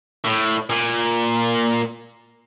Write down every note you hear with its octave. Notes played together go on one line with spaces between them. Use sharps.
A2
A#2